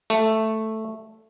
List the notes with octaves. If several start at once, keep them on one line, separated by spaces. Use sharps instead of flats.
A3